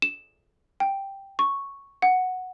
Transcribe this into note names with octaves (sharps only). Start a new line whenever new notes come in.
E7
G5
C#6
F#5